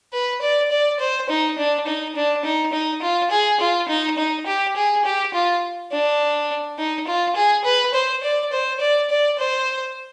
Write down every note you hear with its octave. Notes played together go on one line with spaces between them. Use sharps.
B4
D5
D5
C5
D#4
D4
D#4
D4
D#4
D#4
F4
G#4
F4
D#4
D#4
G4
G#4
G4
F4
D4
D#4
F4
G#4
B4
C5
D5
C5
D5
D5
C5